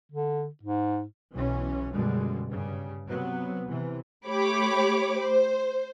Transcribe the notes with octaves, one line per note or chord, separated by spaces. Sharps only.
D3
G#2
B1 E3 C#4
F#2 B2 D3 G3 G#3
G2 C#3 G3
C3 F#3 B3
C3 E3
A3 G4 C#5 B5 D6
C5